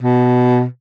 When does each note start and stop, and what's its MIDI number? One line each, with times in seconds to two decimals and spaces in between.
0.01 0.64 47